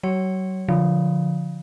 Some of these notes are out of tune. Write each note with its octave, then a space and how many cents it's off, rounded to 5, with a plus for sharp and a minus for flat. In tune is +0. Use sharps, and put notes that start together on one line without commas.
F#3 +35 C#5 +0
D3 -20 F3 +0